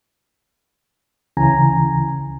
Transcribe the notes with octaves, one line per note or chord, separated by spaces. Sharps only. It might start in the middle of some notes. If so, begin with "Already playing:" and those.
C#2 C#3 E3 G#5 A#5